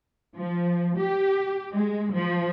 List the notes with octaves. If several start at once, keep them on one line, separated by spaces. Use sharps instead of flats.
F3
G4
G#3
F3